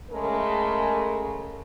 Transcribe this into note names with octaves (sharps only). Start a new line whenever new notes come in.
C#3 G#3 A3 A#4